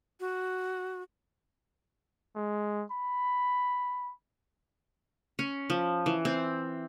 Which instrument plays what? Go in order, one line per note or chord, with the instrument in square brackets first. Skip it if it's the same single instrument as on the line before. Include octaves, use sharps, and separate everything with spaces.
[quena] F#4
[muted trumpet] G#3
B5
[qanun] C#4
F3
E3
C4